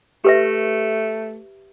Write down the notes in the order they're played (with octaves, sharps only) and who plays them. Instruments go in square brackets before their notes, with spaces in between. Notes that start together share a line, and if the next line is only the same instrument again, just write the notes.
[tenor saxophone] A3 [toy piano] G4 B4 E5